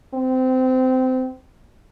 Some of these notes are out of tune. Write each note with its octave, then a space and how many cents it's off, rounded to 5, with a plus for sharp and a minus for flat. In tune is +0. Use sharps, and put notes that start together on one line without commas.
C4 -20